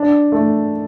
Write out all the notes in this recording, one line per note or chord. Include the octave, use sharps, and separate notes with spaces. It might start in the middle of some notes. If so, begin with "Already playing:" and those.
Already playing: D4
A3